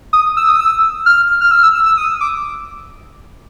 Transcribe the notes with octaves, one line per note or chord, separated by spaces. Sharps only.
D#6
E6
D#6
E6
F6
F6
E6
E6
E6
E6
D#6
D6